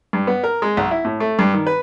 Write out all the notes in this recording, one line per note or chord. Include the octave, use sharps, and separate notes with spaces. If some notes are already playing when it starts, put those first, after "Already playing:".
G2
B3
A#4
G#3
B1
E4
A2
A3
G2
D#3
B4